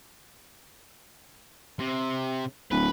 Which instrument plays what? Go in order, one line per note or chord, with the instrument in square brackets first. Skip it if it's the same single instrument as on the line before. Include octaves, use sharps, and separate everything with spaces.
[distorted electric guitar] C3
[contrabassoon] D1 [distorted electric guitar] B4